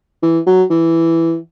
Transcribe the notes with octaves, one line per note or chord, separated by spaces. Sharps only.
E3
F#3
E3